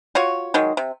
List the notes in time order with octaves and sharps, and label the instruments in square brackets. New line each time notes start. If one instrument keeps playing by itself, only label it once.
[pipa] F4 F#4 C#5
D#3 F#3 G#3
C3